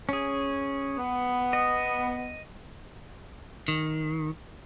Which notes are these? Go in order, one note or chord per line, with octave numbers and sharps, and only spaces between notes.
C#4 G#4
B3
D#5
D#3